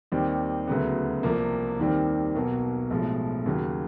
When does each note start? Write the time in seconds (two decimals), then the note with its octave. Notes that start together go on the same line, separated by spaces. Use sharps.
0.12 D#2 D#3 G3 C4 D#4
0.68 D2 C#3 F#3 B3
1.23 C2 C3 F3 A#3
1.79 D#2 D#3 G3 C4
2.35 B1 B2 F#3 A#3
2.90 B1 A2 F3 G#3
3.46 D#2 C#3 F#3